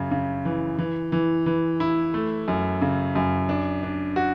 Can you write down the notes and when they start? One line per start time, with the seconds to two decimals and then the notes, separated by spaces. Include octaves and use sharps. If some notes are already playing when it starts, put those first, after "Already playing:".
Already playing: F#2 C#3
0.11 C#3
0.45 E3
0.79 E3
1.12 E3
1.46 E3
1.80 E4
2.14 A3
2.48 F#2
2.81 C#3
3.15 F#2
3.49 D4
3.83 D4
4.16 F#4